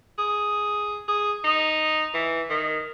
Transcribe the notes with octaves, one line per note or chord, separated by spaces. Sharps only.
G#4
G#4
D#4
E3
D#3